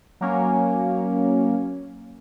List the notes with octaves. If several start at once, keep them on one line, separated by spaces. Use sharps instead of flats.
F#3 A#3 C#4